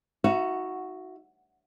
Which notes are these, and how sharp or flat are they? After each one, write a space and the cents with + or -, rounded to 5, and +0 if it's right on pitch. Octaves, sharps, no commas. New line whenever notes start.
D#4 +45 F#4 +0 E5 +40